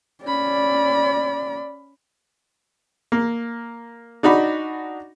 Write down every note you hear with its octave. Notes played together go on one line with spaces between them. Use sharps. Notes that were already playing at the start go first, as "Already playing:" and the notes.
C#4 D5 B5
A#3
D4 D#4 F#4 B5 D6